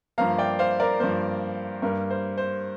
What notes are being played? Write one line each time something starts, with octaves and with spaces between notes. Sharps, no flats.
G2 F3 A#3 F5 A#5
D5 G5
C5 F5
A#4 D5
G2 F3 A#3 C5
G2 G3 A#3 A#4
C5
C5